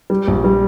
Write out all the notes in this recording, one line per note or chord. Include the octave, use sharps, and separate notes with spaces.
G3
A#1
G3